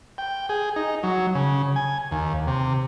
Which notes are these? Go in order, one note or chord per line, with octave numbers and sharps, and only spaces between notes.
G5
G#4
D#4
F#3
C#3
G#5
D#2
C3